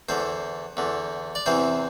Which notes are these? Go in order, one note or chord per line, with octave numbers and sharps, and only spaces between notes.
E2 D3 C5
E2 D3
D5
E2 C3 E3 C5